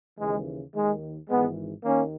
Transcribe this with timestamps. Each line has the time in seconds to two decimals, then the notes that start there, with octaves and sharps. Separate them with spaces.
0.18 D#2 C#3 E3 G#3
0.74 D#2 D#3 G#3
1.29 G#1 G#2 E3 G#3 B3
1.84 D#2 D#3 A#3 C#4